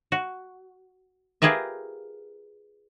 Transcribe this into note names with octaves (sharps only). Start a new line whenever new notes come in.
F#4
F4 G4 G#4 A#4 B4 E5